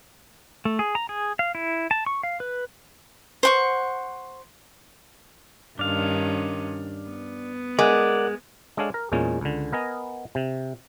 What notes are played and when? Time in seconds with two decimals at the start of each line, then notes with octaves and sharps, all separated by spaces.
0.65 A3
0.79 G#4
0.95 A#5
1.09 G#4
1.39 F5
1.55 E4
1.91 A5
2.06 C#6
2.23 F5
2.40 B4
3.43 C5 F#5 C#6
5.79 G2 D#3 C#4 D4 F5
7.09 B3
7.79 G#3 A#4 D5 F#5 F#6
8.77 G#3 D4 A4 C#5 F5
8.94 A#4
9.12 E2 A#2 G#3 A#3 C#4
9.41 C#2 D3
9.73 B3 A#4 D#5 G#5 A#5
10.35 C3